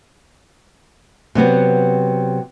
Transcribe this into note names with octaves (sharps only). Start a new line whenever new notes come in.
C3 F#3 B3 C4